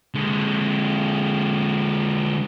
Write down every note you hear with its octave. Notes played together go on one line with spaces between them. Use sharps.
D3 G#3